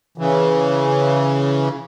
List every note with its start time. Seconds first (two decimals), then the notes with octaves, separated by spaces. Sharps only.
0.18 C#3 E3